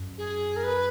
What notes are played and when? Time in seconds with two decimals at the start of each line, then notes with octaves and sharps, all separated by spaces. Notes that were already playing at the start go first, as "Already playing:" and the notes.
Already playing: F#2
0.18 G#4
0.56 A#4
0.63 B4